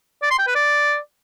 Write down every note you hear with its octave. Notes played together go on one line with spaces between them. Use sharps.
D5
C6
G5
B4
D5